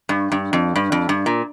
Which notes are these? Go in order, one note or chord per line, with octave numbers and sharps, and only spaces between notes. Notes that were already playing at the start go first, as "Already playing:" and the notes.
G2
G2
F2
G2
F2
G2
A#2